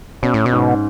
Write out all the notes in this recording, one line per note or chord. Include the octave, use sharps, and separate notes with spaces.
B2 C#4
A2
B2
G#2